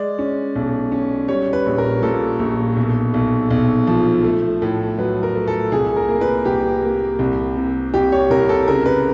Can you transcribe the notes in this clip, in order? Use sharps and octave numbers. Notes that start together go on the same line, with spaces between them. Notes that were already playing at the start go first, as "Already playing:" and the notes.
Already playing: G#3 D5
C#4
B1
C#4
G3 C#5
B4
A#1
A#4
A#2 A4
A#1
B1
B1
B1
F3
A3
A2
F#3 B4
A#4
A3
A4
C2 G#4
A#4
A#3
B4
C2 G4
A#3
C2
C3
C2 G4
C#5
C2 A#4
A4
C#3 A#4
B4